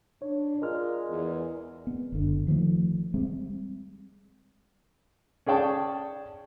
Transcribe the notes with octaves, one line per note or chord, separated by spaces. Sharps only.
D4 C#5
G#3 F4 A#4 D5 F6
E2
B3
F#1 D3
D#3 F3 G#3 A3
G3 G#3 C4
C#4 G#4 D5 G5 A5 C#6